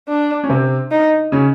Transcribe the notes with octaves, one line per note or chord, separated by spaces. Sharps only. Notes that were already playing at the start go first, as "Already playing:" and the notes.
D4
C#4
C3 C4
D#4
C#3 C#4